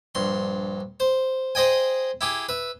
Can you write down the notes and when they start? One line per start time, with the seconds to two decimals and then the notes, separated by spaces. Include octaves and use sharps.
0.15 A#1 G2 C6
1.00 C5
1.55 G#4 C5 D#5 G5 G#5
2.21 E4 G4 G#4
2.49 B4 E5